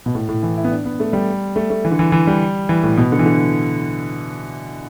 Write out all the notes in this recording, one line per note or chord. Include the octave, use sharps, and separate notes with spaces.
B2
A2
A2
E3
E4
B3
D4
B3
A3
G3
A3
A3
E3
D3
E3
E3
G3
E3
A2
B2
D3
E3
D3